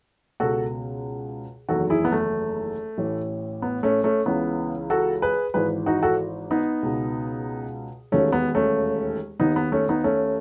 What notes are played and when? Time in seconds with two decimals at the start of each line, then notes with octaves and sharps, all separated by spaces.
0.40 C#2 B2 F#4 A4
1.69 F#1 E2 D#3 F#4 A4
1.90 E4 G#4
2.05 B3
2.12 A3
2.98 A1 A2 E3
3.62 B3
3.83 A3 C#4
4.04 A3 C#4
4.25 C#2 C#3 E3 B3
4.90 F#4 A4
5.22 G#4 B4
5.54 G#1 G#2 E3 G#4 B4
5.86 D#4 F#4
6.03 F#4 A4
6.51 B3 D#4
6.83 C#2 B2
8.12 E1 D#2 D#3 A3 C#4
8.32 B3
8.55 A3 C#4
9.40 D#2 D#3 B3 D#4
9.56 B3
9.72 A3 C#4
9.89 B3 D#4
10.04 A3 C#4